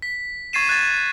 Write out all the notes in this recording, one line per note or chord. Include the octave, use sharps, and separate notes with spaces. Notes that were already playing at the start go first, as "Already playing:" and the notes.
B6
C#6 G#6 A6 C7 D#7 E7
F#6 G#6 A6